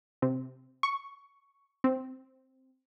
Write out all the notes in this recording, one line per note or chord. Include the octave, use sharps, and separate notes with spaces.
C3
C#6
C4